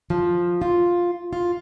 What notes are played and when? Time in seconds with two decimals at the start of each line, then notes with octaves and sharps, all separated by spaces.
0.10 F3
0.62 F4
1.33 F4